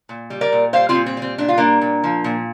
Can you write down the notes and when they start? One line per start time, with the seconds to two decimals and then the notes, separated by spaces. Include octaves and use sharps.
0.09 A#2
0.30 G3
0.41 A#4 D5
0.52 A#2
0.73 G3 C5 F5
0.89 C4 F4
0.95 A#2
1.06 C4
1.17 G3
1.22 C4
1.38 A#2 D4
1.49 F4
1.57 G3 A#3 D4
1.81 A#2
2.04 F3
2.24 A#2